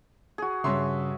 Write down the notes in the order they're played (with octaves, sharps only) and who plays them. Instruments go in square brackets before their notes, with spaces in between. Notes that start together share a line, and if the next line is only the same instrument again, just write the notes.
[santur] F#4 G#4
[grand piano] G2 C#5 C6 [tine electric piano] C#3 [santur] E5